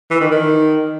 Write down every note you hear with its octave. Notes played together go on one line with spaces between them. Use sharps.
E3
D#3
D#3